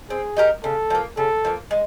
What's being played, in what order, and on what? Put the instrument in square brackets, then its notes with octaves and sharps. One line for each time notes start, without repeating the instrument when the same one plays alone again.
[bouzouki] C4 [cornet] G#4
[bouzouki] D#4 G4 A#4
[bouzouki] C#3 [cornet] A4
[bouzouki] F3 A#3
[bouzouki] C#3 [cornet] A4
[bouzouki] F3 A#3
G#3